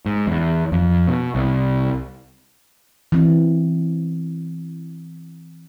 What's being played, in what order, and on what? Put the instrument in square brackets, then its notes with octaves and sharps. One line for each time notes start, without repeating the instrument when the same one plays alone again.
[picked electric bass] G#2
E2
F2
B2
C2
[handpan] E3 C4